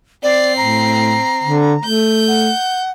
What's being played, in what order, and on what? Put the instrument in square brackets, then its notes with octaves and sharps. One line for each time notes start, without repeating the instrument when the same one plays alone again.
[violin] C4 C7 [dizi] D5
[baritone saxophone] A2 [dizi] A#5
[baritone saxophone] D3
[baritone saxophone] A3 [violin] G6
[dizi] F#5